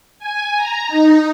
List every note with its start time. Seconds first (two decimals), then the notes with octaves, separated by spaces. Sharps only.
0.19 G#5
0.57 A#5
0.88 D#4